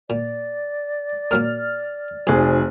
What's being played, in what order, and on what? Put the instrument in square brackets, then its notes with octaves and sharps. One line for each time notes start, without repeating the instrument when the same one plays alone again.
[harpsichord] A#2 [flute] D5
[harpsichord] A#2 F#3 A#3 [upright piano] F6
[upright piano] F1 G#4 [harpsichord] F2 [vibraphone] D#4 F#4 C5